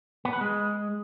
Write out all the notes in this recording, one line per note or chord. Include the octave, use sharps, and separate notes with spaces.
B3
B4
G#3